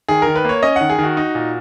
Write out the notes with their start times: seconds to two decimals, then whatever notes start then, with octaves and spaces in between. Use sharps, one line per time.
0.08 D#3 G#4
0.22 D#3 A#4
0.36 B4
0.45 A#3 C#5
0.63 C#4 D#5
0.76 D#3 F#5
0.90 G#4
0.98 D#3 F#4
1.17 D#4
1.35 A#2